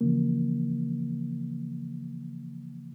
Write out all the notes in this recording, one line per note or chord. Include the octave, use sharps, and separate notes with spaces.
C#3 E3 F3 A#3